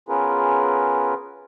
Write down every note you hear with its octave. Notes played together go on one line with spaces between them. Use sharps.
B3 C#4 F4 G#4 A#4 B4